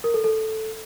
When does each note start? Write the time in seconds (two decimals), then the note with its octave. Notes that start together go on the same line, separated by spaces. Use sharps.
0.04 A#4
0.14 A4
0.24 A4